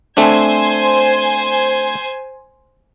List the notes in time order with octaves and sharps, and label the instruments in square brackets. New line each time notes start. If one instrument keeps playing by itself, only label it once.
[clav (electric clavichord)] A3 C4 D4 [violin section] C5 G#5 G#6